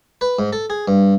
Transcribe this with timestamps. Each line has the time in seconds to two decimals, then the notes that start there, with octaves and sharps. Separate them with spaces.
0.21 B4
0.39 G#2
0.53 A4
0.70 G#4
0.88 G2